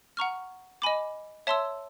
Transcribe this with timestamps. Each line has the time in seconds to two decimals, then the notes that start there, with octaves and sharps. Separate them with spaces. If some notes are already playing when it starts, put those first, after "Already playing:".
0.17 F#5 A#5 C#6 F6
0.82 D#5 G#5 B5 D6
1.47 C#5 E5 A5 C6 E6